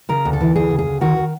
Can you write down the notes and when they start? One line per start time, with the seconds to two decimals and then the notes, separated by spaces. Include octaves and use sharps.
0.09 C#3 A#4
0.25 D2
0.33 A4
0.41 E3
0.55 D2 G#4
0.70 C#3
0.79 G#4
0.87 D2
1.01 D#3 F#4
1.16 D#3